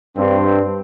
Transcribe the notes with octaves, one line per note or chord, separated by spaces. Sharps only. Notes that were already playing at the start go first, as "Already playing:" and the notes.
G2 C4